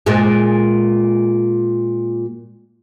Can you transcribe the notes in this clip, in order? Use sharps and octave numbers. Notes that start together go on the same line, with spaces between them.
A#2 G#3